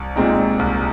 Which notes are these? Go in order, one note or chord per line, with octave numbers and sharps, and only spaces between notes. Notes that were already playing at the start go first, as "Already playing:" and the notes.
Already playing: C2
A#2 G#3 C4 D#4
C2